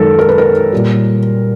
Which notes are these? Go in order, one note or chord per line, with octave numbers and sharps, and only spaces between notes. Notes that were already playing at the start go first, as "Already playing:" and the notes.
Already playing: F#2 D#3 G#3 A4 A#4
A#4
B4
A#4
A#2 G3